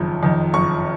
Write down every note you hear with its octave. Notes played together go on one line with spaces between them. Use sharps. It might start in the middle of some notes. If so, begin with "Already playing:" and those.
Already playing: F#1 F2 D#3
F2 D#3
F#1 C#6